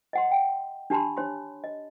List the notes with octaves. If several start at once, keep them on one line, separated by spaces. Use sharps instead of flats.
D#5 F#5 C6
G5
D4 G4 A5 B5 C6
D4 C#5 C6
D#5